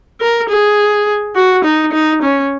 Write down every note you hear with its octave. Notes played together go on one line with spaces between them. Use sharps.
A#4
G#4
F#4
D#4
D#4
C#4